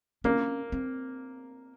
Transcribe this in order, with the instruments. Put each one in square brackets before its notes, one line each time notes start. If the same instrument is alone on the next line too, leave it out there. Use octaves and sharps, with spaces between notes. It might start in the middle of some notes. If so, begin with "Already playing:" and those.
[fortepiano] A#3 [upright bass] C#4
[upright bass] C4